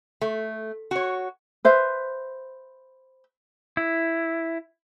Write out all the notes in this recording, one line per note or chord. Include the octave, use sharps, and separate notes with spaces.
A3
F#4 C#5
B4 C5 E5
E4